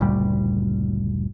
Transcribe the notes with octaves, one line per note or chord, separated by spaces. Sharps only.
F#1 D2 A#2 G3